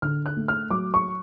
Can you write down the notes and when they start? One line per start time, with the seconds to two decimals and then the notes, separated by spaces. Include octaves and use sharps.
0.02 D3 F6
0.26 F#6
0.36 A3
0.48 F6
0.70 F#3 D6
0.94 C#6